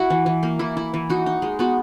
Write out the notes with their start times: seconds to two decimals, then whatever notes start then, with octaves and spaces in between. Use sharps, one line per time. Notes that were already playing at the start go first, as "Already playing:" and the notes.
Already playing: E4 F#4
0.10 E3
0.26 E3
0.43 A#3
0.59 E3 E4
0.77 E4
0.94 E3
1.10 D#4 F#4
1.26 D#4
1.42 G#3
1.59 B3 F#4